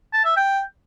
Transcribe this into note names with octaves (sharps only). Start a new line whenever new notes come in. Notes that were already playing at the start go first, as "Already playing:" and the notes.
A5
E5
G5